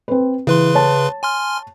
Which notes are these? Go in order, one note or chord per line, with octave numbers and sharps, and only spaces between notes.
C4 B4
C#3 E3 B4 C6
C#5 A5
G#5 C6 F6